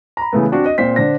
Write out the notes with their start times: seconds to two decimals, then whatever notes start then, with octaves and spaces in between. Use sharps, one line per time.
0.17 A#5 B5
0.33 C#3 E3 A3 B3
0.52 C4 D4 F#4
0.66 D#5
0.78 A#2 C4 C5 B6
0.96 D3 D4 C5 A#6